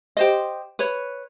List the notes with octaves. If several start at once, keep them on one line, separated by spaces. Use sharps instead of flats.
G4 C5 D#5
B4 C#5